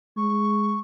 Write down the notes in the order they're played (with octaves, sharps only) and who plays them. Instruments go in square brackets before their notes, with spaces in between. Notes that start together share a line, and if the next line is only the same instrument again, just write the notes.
[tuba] G#3 [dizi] C#6